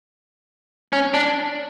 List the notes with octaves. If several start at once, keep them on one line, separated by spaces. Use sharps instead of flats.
C#4
D4